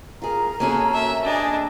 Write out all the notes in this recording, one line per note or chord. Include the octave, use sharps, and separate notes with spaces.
F4 G#4 A#4 A#5
A#3 C#4 F#4 G#4 A4
E5
D4 G#4 D#5 G#5